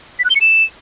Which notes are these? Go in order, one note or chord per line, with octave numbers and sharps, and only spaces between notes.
B6
F#6
G7
C#7
E7